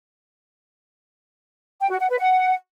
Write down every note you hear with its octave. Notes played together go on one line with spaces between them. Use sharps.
G5
F#4
F#5
B4
F#5